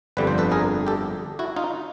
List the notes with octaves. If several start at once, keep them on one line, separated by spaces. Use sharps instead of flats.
G1 F2 D3 G3 B4
C5
A4 B4
G#4 A#4
G4 A4
E4 F#4
D#4 F4